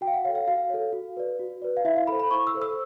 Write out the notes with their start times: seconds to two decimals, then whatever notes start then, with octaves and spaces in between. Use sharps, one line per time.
0.01 F#4 G5
0.08 F5
0.13 F#5
0.25 A4 C#5 F5
0.35 F5
0.47 F#4 F5
0.70 A4 C#5
0.93 F#4
1.17 B4 D5
1.39 F#4
1.62 B4 D5
1.77 F5
1.85 E4 E5
1.96 F5
2.07 A4 C5 B5
2.20 B5
2.31 E4 C#6
2.47 E6
2.54 A4 C5
2.62 E6